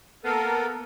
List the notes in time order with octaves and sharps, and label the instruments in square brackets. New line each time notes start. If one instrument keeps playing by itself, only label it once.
[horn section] A#3 B3 [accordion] A4 A#4